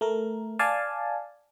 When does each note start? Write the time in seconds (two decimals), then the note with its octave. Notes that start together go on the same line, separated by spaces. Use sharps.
0.01 A3 A#4
0.59 D5 F5 G#5 A5